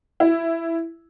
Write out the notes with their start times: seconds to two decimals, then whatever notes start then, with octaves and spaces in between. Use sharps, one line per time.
0.20 E4